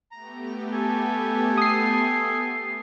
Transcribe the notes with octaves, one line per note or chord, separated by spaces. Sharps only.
A3 B3 G4 A#5
A4 G#5
D#6 C7